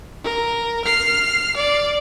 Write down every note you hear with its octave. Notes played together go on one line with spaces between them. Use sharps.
A#4
F6 C7
D5